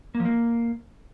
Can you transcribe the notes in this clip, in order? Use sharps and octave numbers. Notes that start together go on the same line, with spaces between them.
A#3
F3
A#3